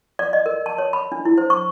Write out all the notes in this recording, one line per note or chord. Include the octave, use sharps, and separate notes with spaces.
D5
D#5
A#4
A5
C#5
B5
D4
E4
C5
C#6